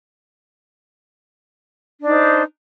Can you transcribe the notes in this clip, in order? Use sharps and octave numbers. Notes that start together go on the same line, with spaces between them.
D4 D#4 C5